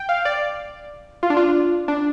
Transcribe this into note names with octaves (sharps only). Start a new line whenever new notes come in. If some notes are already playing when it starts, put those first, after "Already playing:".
Already playing: G5
F5
D5
F4
D4
F4
D4